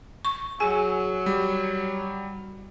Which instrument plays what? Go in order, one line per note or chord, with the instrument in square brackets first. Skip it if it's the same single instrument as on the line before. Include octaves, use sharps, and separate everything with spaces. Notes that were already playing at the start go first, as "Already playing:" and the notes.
[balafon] C#6
[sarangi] F#3 [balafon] G#4 G#5
[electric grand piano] G3